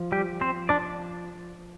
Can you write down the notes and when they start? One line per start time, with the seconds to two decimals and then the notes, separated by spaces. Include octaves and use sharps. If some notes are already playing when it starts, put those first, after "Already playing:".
Already playing: F3
0.12 G3 G4
0.41 C4 C5
0.69 D4 D5